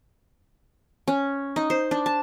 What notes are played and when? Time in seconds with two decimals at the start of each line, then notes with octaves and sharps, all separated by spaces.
1.08 C#4
1.56 D#4
1.70 C5
1.91 D4
2.06 A5